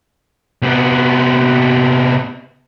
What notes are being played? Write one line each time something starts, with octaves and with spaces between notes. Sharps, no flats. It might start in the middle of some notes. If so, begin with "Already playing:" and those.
C3 B3